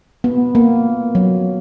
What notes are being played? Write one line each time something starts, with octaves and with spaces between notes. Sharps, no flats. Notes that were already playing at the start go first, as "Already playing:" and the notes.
B3
A#3
F#3